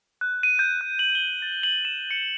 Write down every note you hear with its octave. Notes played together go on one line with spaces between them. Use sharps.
F#6
D#7
G6
F#6
F#7
G7
A6
F#7
E7
C#7